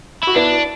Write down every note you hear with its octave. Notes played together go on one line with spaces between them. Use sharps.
E4 F#4
B3 D4 E4